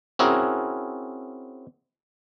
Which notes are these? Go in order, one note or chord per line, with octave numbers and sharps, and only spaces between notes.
C4 C#4 E4 F#4 G#4 A#4